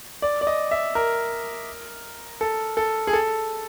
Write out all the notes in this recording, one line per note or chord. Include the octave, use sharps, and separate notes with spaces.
D5
D5
D#5
E5
A#4
A4
A4
G#4
A4